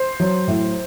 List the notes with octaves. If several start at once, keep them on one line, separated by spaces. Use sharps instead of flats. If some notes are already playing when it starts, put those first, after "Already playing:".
Already playing: C5
F#3
A2